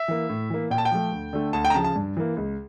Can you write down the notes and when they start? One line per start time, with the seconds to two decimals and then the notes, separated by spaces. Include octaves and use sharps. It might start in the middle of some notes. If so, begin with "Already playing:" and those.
Already playing: E5
0.08 E3 A#3
0.29 A2
0.50 E3 A#3
0.70 A#2 G5
0.78 A5
0.85 G5
0.91 F3 A3
1.12 D2
1.33 D3 A3
1.53 D2 A5
1.65 G5
1.70 A#5
1.74 C#3 F3 A5
1.84 A5
1.96 G2
2.17 E3 A#3
2.37 C#2